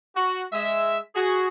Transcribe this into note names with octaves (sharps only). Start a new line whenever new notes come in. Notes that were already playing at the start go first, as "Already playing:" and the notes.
F#4
G#3 E5
F#4 G#4